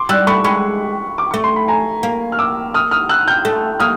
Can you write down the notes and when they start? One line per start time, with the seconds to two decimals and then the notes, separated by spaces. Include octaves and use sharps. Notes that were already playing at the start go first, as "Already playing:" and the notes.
Already playing: C6 D6
0.09 G3 E6 F#6
0.27 A3 B5 C#6
0.44 G#3 B5 C#6
1.18 D6
1.31 A3 C#6
1.44 C6
1.56 B5
1.68 G#5 A#5
2.03 A#3
2.32 F6
2.39 D6 E6
2.74 D#6 F6
2.91 D#6 F6
3.09 E6 F#6
3.28 F6 G6
3.45 A3
3.80 A#3 D#6 F6